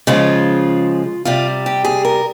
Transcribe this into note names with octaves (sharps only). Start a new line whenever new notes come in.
C#3 F3 G#3 F4
C3 G3 F4
G4
G#4
A#4